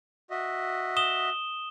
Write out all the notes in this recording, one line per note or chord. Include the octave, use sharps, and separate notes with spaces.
F#4 D#5 E5
D#6 E7 G7